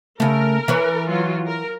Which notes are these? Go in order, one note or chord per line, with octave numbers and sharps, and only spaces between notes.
C#3 A3 A#4
E3 B4 C#5
F#3 F4
A#4